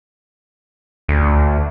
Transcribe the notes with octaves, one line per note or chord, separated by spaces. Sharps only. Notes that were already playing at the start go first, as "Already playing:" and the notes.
D2